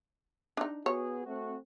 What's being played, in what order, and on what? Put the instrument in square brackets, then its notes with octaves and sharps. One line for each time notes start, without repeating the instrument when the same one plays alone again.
[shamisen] D4 D#4
[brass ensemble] B3 F#4 G#4 [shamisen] C#5
[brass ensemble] A3 C4 F#4